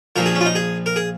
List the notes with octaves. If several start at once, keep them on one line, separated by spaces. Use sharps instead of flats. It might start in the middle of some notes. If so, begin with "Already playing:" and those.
A#1 A#2 F3 A#4
G#4
C#4
F4
D#4
G#4
A#4
G#4